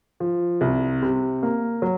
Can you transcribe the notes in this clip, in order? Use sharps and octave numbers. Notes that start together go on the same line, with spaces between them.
F3
C2
C3
A#3
F#3